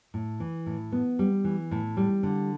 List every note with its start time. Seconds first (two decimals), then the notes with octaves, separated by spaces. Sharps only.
0.14 A2
0.40 E3
0.66 A2
0.92 B3
1.19 G3
1.44 E3
1.71 A2
1.97 G3
2.23 D3